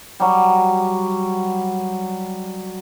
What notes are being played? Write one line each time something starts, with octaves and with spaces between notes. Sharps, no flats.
F#3 G3